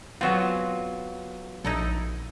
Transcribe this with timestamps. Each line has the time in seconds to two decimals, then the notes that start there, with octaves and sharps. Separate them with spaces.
0.21 F#3 B3 C4 F4 F#4 G#4
1.65 A#1 D#4 E4 A4